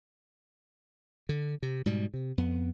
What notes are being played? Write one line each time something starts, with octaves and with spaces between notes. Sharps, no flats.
D3
C3
G#2 B2 G3
C3
F2 B3